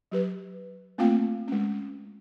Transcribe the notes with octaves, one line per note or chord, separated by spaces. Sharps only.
F#3 G4 B4
A3 A#3 C4 F4 F5 G5
G#3 C#4